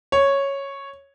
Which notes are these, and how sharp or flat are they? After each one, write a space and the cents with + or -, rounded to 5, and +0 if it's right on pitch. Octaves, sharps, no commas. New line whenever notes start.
C#5 -5